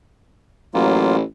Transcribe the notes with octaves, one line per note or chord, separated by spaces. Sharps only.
A1 F#3 A#3 F4